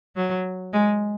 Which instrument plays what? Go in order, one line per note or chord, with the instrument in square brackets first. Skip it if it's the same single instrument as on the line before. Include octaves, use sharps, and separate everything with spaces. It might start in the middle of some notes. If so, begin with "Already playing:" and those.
[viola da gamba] F#3
G#3